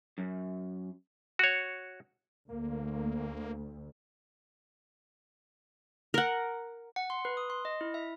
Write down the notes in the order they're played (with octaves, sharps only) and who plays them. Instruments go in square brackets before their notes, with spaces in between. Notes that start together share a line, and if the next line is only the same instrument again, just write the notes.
[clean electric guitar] F#2
[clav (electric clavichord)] F#4 C#5
[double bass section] D2 [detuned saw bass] A#3
[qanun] A#4 F#5
[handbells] F#5
C6
B4
D#6
C6
D#5
E4
E5